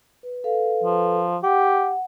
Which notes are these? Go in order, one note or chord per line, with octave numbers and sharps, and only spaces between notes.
B4
A4 B4 F5
F3
G4 F#5